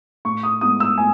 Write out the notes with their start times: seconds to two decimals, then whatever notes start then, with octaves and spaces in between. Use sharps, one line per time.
0.25 A2 C#6
0.43 D#6
0.61 G#3 B3 E4 D#6
0.80 E6
0.98 A2 G#5